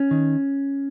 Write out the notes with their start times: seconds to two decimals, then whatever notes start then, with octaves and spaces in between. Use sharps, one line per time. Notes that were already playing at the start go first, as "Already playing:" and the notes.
Already playing: C#4
0.11 D#3